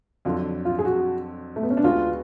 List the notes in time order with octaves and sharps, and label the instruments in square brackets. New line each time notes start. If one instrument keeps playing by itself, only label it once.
[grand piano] F2 D3 F#3 [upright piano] F4
[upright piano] F4
G#4
F#4
A3
B3
C#4
D4
[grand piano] D2 D3 G#3 B3 F#4 [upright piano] F4